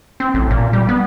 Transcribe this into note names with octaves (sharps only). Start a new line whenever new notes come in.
C4
A1
A#2
G3
B3